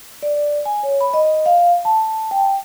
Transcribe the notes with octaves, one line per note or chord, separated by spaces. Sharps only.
D5
G#5
C#5
B5
D#5
F5
A5
G5